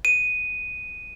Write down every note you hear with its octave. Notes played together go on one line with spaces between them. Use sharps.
D#7